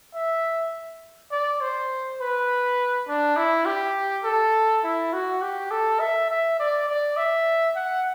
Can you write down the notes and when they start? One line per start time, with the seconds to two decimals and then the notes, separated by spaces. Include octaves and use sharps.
0.14 E5
1.31 D5
1.61 C5
2.20 B4
3.08 D4
3.36 E4
3.66 G4
4.24 A4
4.84 E4
5.13 F#4
5.42 G4
5.71 A4
6.00 E5
6.30 E5
6.59 D5
6.89 D5
7.17 E5
7.76 F#5